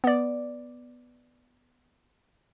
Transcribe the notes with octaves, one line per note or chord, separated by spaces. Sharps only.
B3 D5